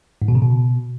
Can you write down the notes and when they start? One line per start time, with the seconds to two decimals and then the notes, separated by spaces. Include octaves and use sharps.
0.22 G#2
0.28 B2
0.35 C#3
0.42 B2